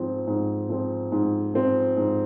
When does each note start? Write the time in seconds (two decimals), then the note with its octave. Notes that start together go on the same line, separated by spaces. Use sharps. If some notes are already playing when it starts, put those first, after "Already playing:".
Already playing: G#2 F3 C4
0.27 G#2
0.69 F3 C4
1.12 G#2
1.54 F3 C4
1.97 G#2